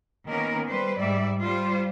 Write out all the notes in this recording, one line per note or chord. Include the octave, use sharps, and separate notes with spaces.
D#3 A#3 B3 C#4 A#4
G3 B4 C5
G#2 G3 D5 E5
G3 F4 C5